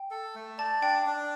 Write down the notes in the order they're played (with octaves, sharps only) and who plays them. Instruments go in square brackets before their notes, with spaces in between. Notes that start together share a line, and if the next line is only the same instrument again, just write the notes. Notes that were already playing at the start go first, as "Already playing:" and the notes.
Already playing: [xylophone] G5
[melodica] A4
A3
[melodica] D5 [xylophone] A5
[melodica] D4 [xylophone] G5
[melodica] D4